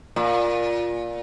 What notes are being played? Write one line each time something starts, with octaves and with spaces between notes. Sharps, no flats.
A#2